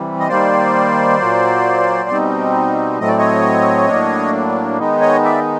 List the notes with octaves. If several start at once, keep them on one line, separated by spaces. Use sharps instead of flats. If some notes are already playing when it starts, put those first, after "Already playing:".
Already playing: C3 E3 G3
D#5
D#3 G3 A#3 C5 D5
A#2 F#3 A#3
B2 G3 C4 D#4
A2 F#3 A3 C4 D#5
D5
C#5 D#5
A2 F#3 A#3 D4
D#3 G#3 B3 D#4
C#5 D#5
D5 E5